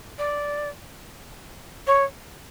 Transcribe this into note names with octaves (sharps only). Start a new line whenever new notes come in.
D5
C#5